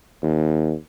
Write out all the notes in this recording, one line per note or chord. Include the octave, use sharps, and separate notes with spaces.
D#2